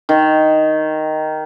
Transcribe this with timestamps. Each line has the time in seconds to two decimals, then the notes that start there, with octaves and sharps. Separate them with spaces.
0.09 D#3